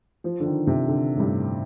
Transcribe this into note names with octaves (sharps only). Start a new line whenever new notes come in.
F3
D3
D#3
C3
D3
A2
G2